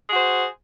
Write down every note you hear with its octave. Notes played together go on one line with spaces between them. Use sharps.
F#4 G#4 C5